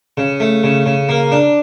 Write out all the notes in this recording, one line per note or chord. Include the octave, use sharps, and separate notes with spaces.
C#3
A3
C#3
C#3
A#3
D4